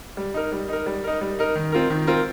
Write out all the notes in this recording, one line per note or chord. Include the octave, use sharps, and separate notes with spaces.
G3
D#4 A#4
G3
D#4 A#4
G3
D#4 A#4
G3
D#4 A#4
D#3
C4 F4 A#4
D#3
C4 F4 A#4